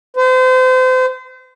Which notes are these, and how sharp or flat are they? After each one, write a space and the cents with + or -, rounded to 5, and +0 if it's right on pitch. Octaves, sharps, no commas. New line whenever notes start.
C5 -35